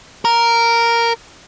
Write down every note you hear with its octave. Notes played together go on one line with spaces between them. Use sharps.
A#4